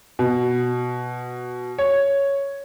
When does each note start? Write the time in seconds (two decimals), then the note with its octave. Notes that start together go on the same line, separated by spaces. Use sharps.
0.19 B2
1.78 C#5